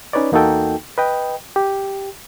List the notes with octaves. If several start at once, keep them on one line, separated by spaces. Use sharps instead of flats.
C#4 D#4 B4 C#5 D5
E2 A#3 D#4 F#4 A4 G5
B4 D#5 G5
G4